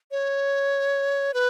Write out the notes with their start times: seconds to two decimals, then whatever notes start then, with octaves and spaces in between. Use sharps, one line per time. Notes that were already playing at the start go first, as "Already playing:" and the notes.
0.11 C#5
1.34 B4